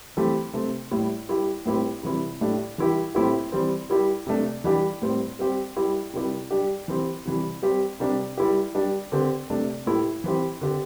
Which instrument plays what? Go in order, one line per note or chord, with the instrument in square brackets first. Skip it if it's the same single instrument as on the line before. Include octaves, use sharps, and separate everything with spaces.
[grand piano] E3 A3 C4 G4
C3 A3 C4
A2 G3 E4
G3 E4 G4
A2 G3 C4 E4 G4
C3 E3 G3 E4
A2 A3 D4 G4
E3 G3 E4 G4
A2 A3 C4 E4 G4
E3 G3 C4
G3 E4 G4
C3 A3 D4
E3 G3 D4 G4
A2 G3 C4
G3 C4 G4
G3 E4 G4
C3 G3 E4 G4
G3 D4 G4
E3 C4 G4
C3 E3 G3
G3 C4 G4
C3 G3 D4 G4
G3 E4 G4
G3 D4 G4
D3 C4 G4
C3 A3 D4
A2 A3 E4 G4
E3 C4 G4
D3 C4 G4